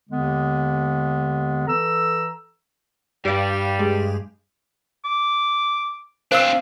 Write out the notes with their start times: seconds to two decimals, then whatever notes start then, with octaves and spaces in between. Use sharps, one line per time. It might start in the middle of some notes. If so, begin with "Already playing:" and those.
0.10 D#2 D3 G#3 B3
1.68 E3 A4 A#5 E6
3.25 G2 G3 G4 F5
3.79 G#3 G4 G#4
5.05 D6
6.32 C4 D4 C5 F5 E6